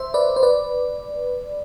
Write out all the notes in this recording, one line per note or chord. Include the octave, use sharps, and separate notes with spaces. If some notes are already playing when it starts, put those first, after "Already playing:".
Already playing: C5 E5
B4 D5
C5
B4 D5